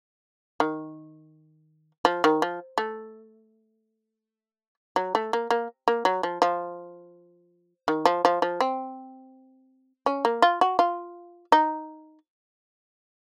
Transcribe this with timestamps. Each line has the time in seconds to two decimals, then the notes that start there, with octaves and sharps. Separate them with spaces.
0.60 D#3
2.05 F3
2.24 D#3
2.42 F3
2.78 A3
4.96 F#3
5.15 A3
5.33 A#3
5.51 A#3
5.88 A#3
6.05 F#3
6.23 F3
6.42 F3
7.88 D#3
8.05 F3
8.25 F3
8.42 F3
8.61 C4
10.06 C#4
10.25 A#3
10.42 F4
10.61 F#4
10.79 F4
11.52 D#4